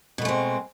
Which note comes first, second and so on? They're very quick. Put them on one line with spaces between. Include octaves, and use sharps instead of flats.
B2 A3 G#3 C4